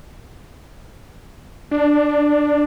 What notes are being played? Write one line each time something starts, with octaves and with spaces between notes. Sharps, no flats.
D4